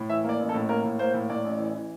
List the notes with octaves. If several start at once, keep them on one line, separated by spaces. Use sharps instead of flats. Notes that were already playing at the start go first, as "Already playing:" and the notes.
Already playing: A2
E3 E5
A#3 D5
A1
A4
A2
A#3 A#4
A2
A#3 C5
A2
A2 D5
A1
E3
E3